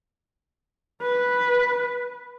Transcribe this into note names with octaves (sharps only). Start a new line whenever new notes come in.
B4